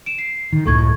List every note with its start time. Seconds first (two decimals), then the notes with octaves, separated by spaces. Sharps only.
0.06 D7 E7
0.18 C7
0.53 D#3
0.66 F#1 C#2 A2 A4 C#6 G#6